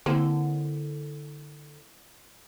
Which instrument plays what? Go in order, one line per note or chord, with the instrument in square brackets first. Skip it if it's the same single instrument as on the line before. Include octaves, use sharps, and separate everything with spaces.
[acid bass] D3 [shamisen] A#3 C4 C5 [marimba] E4